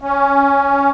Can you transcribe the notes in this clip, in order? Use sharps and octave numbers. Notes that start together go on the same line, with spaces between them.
C#4